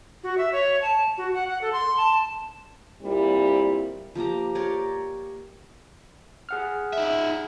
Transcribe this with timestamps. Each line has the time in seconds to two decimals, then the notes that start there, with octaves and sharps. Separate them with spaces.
0.23 F#4
0.38 E5
0.52 C#5
0.82 A5
1.18 F#4
1.34 F#5
1.48 F#5
1.62 A4
1.73 C6
1.97 A5
3.02 A#2 G3 C4 E4
4.15 F3 A#3 G4 A#5
4.55 G4 A#4 C#5 D5
6.49 G#4 F#5 F6
6.93 D#4 E5